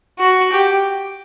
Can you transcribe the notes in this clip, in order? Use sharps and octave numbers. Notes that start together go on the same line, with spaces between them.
F#4
G4